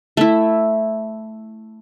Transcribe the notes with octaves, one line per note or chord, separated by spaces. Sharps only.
A3 E4